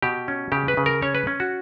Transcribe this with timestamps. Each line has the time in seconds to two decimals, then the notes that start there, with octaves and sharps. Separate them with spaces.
0.02 B2 G4
0.28 C#4
0.52 C#3 G4
0.68 B4
0.77 C#3
0.86 A#4
1.02 C#4 C#5
1.15 B4
1.27 C#4
1.40 F#4